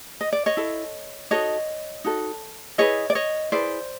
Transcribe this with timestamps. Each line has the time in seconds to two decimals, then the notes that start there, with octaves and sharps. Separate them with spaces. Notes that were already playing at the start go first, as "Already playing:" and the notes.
0.21 D#5
0.33 D5
0.46 C#5 D#5
0.57 E4 A4
1.30 D#4 F#4 A4 C#5 D#5
2.04 D#4 F#4 A4
2.78 E4 G#4 B4 C#5 D#5
3.10 D5
3.15 C#5 D#5
3.52 E4 G#4 B4 C5 D5